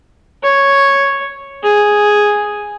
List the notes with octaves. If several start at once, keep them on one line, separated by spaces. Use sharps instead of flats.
C#5
G#4